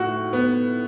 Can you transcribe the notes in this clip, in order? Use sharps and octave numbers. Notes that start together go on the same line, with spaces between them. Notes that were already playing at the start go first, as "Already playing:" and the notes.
Already playing: A2 F#4
B3